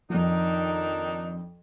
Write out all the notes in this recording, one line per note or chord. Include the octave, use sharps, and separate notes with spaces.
F2 D#3 F3 D4 D#4